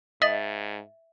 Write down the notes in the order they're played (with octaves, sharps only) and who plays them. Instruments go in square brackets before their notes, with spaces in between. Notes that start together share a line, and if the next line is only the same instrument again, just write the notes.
[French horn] G#2 [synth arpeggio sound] D#5 [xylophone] E5 A6 F#7